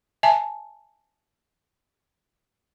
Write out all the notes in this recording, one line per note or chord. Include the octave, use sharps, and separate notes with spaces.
E5 G#5 A5